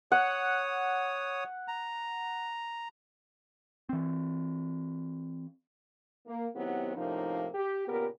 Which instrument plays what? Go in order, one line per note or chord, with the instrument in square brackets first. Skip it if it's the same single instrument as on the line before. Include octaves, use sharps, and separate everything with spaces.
[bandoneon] C#5 D#6 [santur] F#5
[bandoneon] A#5
[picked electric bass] E3 C4
[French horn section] A#3
D#3 F#3 B3 C4 E4 G4
A2 C3 F3 A#3 C#4 D#4
G4
A#2 C#3 B3 G4 A#4